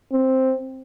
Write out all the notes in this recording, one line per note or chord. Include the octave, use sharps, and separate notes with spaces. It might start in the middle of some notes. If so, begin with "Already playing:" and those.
C4